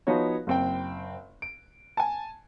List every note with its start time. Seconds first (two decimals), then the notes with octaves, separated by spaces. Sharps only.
0.07 F3 B3 D#4 F#4 C#5
0.47 F#1 C4 G5
1.42 D7
1.97 G#5 A5